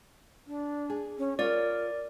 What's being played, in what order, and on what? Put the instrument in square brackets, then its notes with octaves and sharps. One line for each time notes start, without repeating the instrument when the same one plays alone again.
[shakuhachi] D4
[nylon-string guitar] G#4
[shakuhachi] C#4
[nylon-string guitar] F4 C#5 [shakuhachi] A#4 [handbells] D5